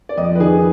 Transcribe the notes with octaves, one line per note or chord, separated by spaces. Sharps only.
D5
F2 D#5
B4
D#3 G#4